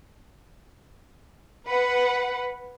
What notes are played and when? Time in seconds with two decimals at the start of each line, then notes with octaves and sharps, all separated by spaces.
1.66 B4 F#5